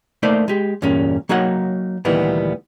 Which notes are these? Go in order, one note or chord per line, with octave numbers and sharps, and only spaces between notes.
A3 A#3 D#4 C5 D5
G#3 G4
E2 G2 A#2 A#3 C#4
F#3 A#3 D#4 F#4 C#5 F#5
D2 A#2 D#3 E3 G3 B3